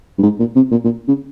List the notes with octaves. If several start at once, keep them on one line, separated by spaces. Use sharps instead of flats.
G2
G#2
A#2
C3
A#2
A#2
C#3